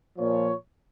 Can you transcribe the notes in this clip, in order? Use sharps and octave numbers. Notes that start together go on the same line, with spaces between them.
A#2 F3 C#5